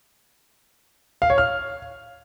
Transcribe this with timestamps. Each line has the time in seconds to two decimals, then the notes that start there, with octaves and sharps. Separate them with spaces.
1.22 F5
1.30 C#5
1.38 F6